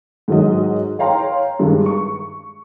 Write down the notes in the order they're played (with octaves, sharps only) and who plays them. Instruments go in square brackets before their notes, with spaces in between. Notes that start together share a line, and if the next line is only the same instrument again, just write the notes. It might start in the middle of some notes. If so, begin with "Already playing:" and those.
[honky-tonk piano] G#2 D#3 F#3 D#5
C#5 F5 G5 A#5 C6
G2 D#3 G#3
C#6